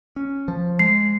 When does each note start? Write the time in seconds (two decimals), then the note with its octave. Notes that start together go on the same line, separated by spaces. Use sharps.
0.16 C#4
0.48 F3
0.79 G#3 C7